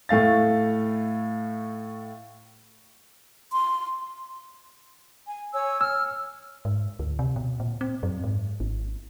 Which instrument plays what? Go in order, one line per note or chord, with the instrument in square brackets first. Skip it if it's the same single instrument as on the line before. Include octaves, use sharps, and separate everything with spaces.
[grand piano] A2 A3 F5 A6
[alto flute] C6
[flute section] G#5
C#5 G#5 E6
[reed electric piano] E6 [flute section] F6
[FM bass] G#2
D2
C3
B2
A#2
C4
F#2
G#2
G#1